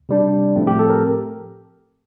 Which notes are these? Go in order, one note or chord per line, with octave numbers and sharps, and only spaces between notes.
C3 G3 D4
A2 F3 A3 C4
G4
A4
A#4